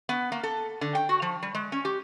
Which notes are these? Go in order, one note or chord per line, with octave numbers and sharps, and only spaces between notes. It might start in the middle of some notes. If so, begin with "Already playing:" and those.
B3
A#3
A4
D3
G5
F#4
F3
G3
G#3
C#4
G4